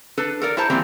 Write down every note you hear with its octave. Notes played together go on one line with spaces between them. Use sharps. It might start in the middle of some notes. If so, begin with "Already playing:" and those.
D4 A4 B4
A4 A#4 D5
E4 A4 C5 A5 A#5
E3 G3 A#3 C4